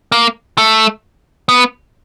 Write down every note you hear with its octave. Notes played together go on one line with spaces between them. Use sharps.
A#3
A3
B3